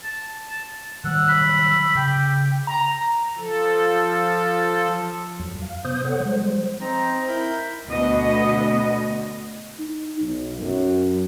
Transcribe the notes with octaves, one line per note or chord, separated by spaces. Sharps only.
A5
D#3 F#3 G3 F#5 E6
B5
C#3 G4 G5
A#5
F3 A4
F2 F#3
F5
C3 B3 C5 D#6 G6
A4 C#5 F#5
F3 G3 G#3 C5
C4 D#4 A#5
E4 A#4 B5 G6
D2 B2 B3 D#5
D#4
B1
F#2